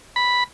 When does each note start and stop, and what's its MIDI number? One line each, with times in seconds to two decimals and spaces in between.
0.16 0.44 83